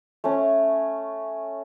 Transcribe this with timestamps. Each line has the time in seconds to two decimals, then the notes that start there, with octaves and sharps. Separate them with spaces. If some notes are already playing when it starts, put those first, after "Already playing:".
0.24 A3 C#4